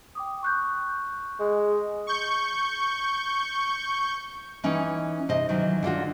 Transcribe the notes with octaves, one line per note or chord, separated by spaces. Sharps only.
G5 D6 D#6
C#6 F#6 G6
G#3
C#6 G6
E3 C#4 D#4 G5
C3 D#5
D#3 E3 F#3
D3 D4 F4 F#4